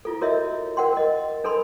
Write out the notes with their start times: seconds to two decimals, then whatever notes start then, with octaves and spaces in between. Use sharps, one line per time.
0.05 E4 F4 A4
0.21 F#4 A#4 C#5 D#5 E5
0.77 A#4 F#5 G5 C6
0.93 A#4 D#5
1.44 D4 A4 A#4 B5 C6